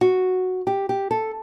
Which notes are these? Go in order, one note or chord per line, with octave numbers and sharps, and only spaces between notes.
F#4
G4
G4
A4